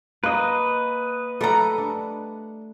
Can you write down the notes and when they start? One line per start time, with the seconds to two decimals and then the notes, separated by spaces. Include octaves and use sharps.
0.24 A#3 B4 D#5
1.41 G3 A3 A4 F#5 A#5
1.78 D4